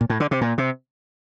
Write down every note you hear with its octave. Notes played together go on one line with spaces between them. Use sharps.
A#2
A2
D3
C3
A#2
C3